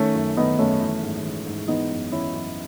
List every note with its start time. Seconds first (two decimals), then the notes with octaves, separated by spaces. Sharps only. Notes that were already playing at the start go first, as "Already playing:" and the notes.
Already playing: D#3 A3 C#4
0.15 F#2
0.37 D#3 B3 D#4
0.59 F#2 A3 C#4
0.80 E3
1.02 G#2
1.24 E3
1.46 G#2
1.68 E3 B3 D#4
1.90 F#2
2.12 E3 C#4 E4
2.34 F#2